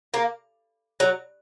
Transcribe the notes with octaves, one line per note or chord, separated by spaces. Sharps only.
A#3
F#3